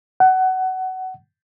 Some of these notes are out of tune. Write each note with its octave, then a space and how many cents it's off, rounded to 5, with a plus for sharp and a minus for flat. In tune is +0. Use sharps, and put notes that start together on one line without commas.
F#5 +20